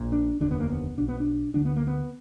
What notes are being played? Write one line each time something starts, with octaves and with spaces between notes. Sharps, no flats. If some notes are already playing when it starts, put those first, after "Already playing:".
Already playing: A#1 A#2
D4
F1 D#2 D3 D4
B3
A#3
B3
B1 B2 D4
B3
D4
D2 D3 D4
B3
A#3
B3